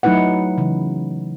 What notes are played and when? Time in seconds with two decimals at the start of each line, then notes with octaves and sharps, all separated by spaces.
0.03 F#3 A3 D#4 E4 B4 F#5
0.58 C#3 E3